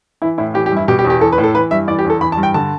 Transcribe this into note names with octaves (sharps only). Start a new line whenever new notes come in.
E3 E4
A2 E4
E3 G4
G4
G2 E4
B2 G4
G4
E2
G4
E3 A4
B4
A2
A4
E3 B4
G2 E5
E3 D5
G4
E2 A4
E3 B5
A5
G2
G5
D3 A5